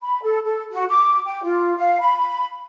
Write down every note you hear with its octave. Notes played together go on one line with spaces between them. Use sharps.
B5
A4
A4
F#4
D6
G5
F4
F5
B5